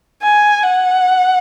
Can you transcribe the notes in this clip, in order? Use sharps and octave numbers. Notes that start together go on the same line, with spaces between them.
G#5
F#5